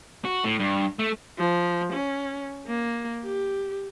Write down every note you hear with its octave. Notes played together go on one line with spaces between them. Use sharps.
F#4
A2
G2
A3
F3
C#4
A#3
G4